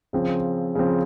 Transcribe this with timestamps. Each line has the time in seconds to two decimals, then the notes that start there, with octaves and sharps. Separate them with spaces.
0.13 C#3 F3 C4
0.75 C#3 F3 C4